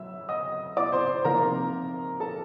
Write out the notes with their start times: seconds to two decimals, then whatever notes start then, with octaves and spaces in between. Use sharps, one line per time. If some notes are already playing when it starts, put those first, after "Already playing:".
Already playing: F#3 E5 E6
0.29 D#5 D#6
0.77 D5 D6
0.92 C5 C6
1.25 C3 F3 A#3 D#4 A#4 A#5
2.20 A4 A5